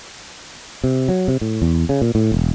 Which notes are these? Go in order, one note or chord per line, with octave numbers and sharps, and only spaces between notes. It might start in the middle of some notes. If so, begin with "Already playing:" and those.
C3
F#3
C3
A2
E2
C#3
A#2
A2
E1